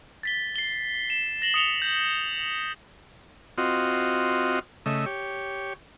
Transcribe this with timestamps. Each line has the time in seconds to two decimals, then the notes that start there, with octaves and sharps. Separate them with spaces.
0.23 A6 B6 G7
0.56 C7 G7
1.10 E7
1.42 A#6 F#7 G7
1.54 D#6 C#7 F7 G7
1.82 G6
3.58 C4 F4 F#4 D#5
4.86 C#3 A3 D#5 E5
5.06 G4 C#5